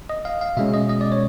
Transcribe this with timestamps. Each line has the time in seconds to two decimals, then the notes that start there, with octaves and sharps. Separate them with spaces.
0.10 D#5
0.25 F5
0.41 F5
0.57 B2 G#3 C#4 E5
0.74 D#5
0.89 D#5
1.01 D5
1.12 C#5